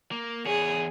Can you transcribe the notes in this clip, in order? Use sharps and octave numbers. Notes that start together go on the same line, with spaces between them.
A#3
E2 G#4 C#5